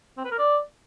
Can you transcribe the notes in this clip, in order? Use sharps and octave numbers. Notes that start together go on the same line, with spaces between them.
C4
B4
A#4
D5